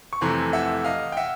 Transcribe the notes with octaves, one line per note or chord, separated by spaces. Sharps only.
C#6
F2 C3 E3 A3 A#5 C6
E5 F#5
D#5 F5
G5
E5 F#5